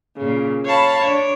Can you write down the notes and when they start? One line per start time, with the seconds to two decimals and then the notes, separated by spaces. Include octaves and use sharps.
0.16 A#2 C#3
0.65 C#5 F5 A5 B5
1.00 D4 C#5